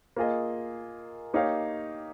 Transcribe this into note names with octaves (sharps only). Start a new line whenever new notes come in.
A#3 F4 G#4 D#5
A#3 D#4 G4 C#5 F5